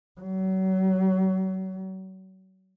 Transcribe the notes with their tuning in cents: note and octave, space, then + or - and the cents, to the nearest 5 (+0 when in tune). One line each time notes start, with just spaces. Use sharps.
F#3 +35